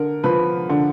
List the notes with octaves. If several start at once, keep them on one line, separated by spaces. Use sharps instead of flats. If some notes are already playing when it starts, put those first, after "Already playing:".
Already playing: D3 A#4
F3 B4
D3